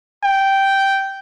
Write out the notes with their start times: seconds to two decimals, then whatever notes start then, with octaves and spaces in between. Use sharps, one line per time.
0.23 G5